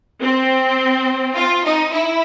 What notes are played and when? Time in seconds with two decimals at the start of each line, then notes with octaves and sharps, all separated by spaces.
0.21 C4
1.35 F4
1.65 D#4
1.94 E4